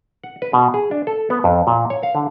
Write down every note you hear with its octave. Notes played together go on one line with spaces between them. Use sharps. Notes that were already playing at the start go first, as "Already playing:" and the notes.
F#5
B4
B2
G#4
D4
A4
B3
F2
A#2
C#5
F5
D3